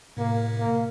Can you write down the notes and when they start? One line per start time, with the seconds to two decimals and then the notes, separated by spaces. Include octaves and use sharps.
0.17 A2 C3 A#3
0.59 A#3